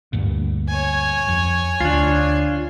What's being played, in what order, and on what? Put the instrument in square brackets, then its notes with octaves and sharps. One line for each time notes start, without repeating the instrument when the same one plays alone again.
[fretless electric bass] D2 G2 A#2
[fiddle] C#5 G#5
[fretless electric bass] F2
[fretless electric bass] D2 [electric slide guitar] D4 F4